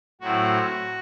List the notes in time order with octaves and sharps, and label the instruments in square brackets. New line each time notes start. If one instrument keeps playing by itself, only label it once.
[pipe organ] A2 F#3 C4 E4 F#4